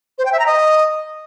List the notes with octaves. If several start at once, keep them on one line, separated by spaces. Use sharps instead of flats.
C5
G5
E5
A#5
D#5